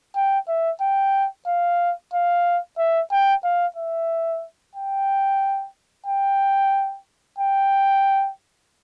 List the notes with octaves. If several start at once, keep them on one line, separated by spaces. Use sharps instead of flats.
G5
E5
G5
F5
F5
E5
G5
F5
E5
G5
G5
G5